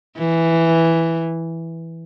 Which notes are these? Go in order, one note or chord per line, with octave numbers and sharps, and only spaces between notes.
E3